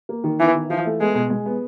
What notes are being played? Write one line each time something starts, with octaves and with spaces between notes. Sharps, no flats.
A#3
D#3
E3 B3
D#3
E3 F3
A3
G#3 B3
B2
G#3
B3